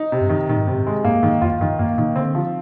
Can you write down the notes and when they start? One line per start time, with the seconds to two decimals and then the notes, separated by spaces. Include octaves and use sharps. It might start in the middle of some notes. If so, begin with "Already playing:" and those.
Already playing: D#4
0.12 C3
0.21 G2
0.30 D#3
0.49 A#2 D#3
0.57 G#2
0.66 G2 C3
0.73 G#2
0.87 G#3
1.05 G#2 A#3
1.23 G#2 D#3
1.42 F2 F4
1.60 G2 D#3
1.79 G2 A#3
1.98 A#2 D#3
2.16 D3 C4
2.35 F3